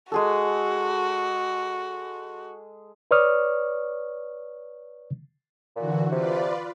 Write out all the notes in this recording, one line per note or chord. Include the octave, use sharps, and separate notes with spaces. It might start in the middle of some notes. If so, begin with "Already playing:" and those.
G#3 F#4 G#4 A4
B4 C#5 D5 C#6 D#6 F6
A#2 D3 E3 F#4
C3 F4 B4 D5